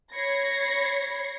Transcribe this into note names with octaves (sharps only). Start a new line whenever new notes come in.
C#5 B5 G#6 A#6 C7 C#7